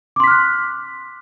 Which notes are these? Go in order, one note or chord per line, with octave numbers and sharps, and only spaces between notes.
C6 D6 F6 F#6 B6